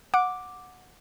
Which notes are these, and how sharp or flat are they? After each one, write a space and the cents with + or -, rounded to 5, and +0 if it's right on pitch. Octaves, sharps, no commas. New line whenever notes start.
F#5 -15 D6 +0